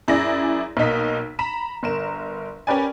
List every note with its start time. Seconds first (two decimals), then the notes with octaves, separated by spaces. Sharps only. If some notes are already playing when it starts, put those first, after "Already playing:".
0.08 F#2 E4 G#4 D5 A#6
0.77 B1 A#3 D#4 B6
1.39 A#5 B5 B6 E7
1.83 G1 A#4 E7
2.67 C#4 G4 A#4 B4 D5 G#5